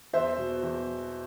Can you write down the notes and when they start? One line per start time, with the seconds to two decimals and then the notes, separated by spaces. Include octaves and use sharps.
0.13 E2 C5 E5
0.38 B2
0.63 E2